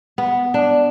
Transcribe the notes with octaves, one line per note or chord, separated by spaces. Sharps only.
B3
D4